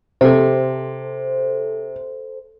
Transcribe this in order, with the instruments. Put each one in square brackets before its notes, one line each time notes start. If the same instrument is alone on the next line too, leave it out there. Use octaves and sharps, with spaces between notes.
[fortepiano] C3 [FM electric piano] A4 C5